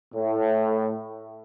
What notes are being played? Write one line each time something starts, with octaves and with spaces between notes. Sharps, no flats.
A2